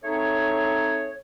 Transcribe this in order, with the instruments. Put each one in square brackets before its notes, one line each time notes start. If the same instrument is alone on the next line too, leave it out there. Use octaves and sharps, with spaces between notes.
[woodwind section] A3 C4 D#4 G#4 C#5